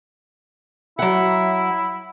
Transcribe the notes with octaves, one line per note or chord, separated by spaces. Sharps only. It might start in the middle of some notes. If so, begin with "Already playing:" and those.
F#3 E4 E5 F#5